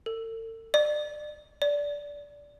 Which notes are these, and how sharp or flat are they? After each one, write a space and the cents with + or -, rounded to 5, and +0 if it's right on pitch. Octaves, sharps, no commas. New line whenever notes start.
A4 +45
D5 +25
D5 -15